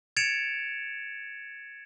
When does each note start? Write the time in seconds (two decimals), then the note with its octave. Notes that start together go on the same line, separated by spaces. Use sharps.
0.17 G#6 A6 C#7 D7 E7 F7